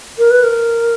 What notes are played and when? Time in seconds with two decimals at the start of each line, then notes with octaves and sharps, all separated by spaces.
0.19 A#4
0.31 B4
0.44 A#4